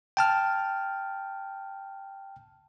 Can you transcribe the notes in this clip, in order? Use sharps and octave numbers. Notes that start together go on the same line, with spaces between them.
G5 A5 F6